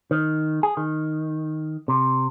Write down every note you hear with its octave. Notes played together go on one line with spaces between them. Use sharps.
D#3
G#4
D#3
C3